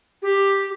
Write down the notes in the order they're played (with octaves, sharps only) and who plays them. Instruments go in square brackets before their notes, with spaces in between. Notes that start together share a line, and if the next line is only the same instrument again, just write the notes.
[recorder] G4